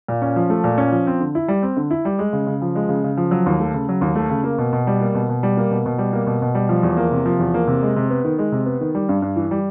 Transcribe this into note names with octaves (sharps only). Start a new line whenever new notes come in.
A#2
C#4
F3
A3
A#2
C#4
F3
C4
D3
E4
G3
C4
D3
E4
G3
G#3
C#3
C#3
F3
G#3
C#3
C#3
F3
F#3
D#2
A3
C#3
F#3
D#2
A3
C#3
A#3
B2
B2
G3
A#3
B2
B2
G3
A#3
B2
B2
G3
A#3
B2
B2
G3
F3
E2
A#3
C3
F3
E2
A#3
C3
G#3
C3
B3
D#3
G#3
C3
B3
D#3
G3
G2
G2
E3
G3